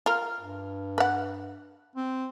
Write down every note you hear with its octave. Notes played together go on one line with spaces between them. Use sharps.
F4 A#4
G2
B4 F#5
C4